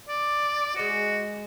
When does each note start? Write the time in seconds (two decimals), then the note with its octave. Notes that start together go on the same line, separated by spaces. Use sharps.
0.09 D5
0.76 G#3 F#4 D#5